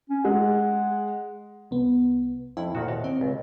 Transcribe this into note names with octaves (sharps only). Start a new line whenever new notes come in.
C#4
G#3 F#5
C2 B3
F2 E4
D2 A#2 D#3 F#4
D#2 A#2
C4
C#2